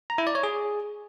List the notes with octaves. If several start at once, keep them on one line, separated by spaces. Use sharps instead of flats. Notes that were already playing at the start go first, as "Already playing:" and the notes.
A#5
E4
D5
C#5
G#4